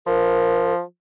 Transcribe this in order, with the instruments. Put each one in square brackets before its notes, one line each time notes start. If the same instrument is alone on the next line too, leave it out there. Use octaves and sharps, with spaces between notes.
[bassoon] F3 [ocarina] A#4